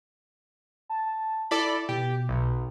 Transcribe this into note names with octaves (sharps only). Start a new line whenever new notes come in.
A5
E4 A4 D5 B5
B2 G4
B1